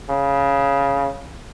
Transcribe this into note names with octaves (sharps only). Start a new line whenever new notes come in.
C#3